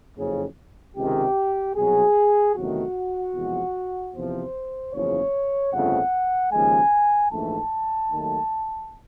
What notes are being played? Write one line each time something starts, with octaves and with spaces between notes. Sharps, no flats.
F#1 F2 C#3
C#2 C3 D#3 G#3 G4
C2 B2 F#3 G#4
E2 C3 D#3 F#3 A3 F#4
E2 C3 F3 G#3
E2 C3 F3 C5
F#1 E2 C#3 F3 C#5
G1 F2 C#3 F3 A3 F#5
D#2 C#3 F3 G#3 G#5
A#1 G#2 E3 A3 A5
D#2 D#3 F#3 A3